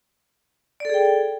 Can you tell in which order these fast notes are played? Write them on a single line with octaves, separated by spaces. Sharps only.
D5 A4 G#4 G5